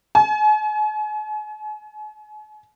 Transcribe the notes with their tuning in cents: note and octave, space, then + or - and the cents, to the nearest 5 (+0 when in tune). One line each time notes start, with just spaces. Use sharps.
G#5 +40